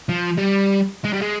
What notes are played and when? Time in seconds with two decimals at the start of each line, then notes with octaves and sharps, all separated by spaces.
0.09 F3
0.38 G3
1.05 G#3
1.13 G3
1.22 G#3